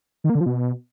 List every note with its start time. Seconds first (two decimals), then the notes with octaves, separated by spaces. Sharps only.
0.24 D#3
0.30 A#3
0.35 D3
0.41 F3
0.46 B2